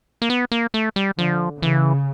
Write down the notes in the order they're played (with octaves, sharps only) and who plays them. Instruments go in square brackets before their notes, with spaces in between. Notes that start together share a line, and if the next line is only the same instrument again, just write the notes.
[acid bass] A#3
B3
A#3
A3
G3
[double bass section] D3 [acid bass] F3
[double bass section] C#3 [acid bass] E3